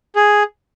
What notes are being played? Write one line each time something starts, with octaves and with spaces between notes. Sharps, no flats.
G#4